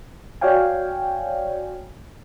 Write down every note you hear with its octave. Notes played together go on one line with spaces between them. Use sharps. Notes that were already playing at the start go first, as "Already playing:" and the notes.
F#4 C#5 D5 F5 G5 G#5